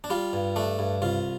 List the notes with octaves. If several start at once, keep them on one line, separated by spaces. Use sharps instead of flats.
D4
G3 F4
G2
A3 D4
G2
C2 F4